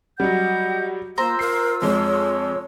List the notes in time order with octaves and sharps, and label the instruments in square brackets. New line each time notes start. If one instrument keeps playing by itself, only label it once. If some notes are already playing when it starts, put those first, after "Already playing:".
[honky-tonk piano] F#3 G3 [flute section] D#5 F#5 G6
[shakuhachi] A#3 [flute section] F4 E6 [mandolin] C5 A#5
[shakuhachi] A#4 [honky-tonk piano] C7
[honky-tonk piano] F2 G#3 [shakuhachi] C#5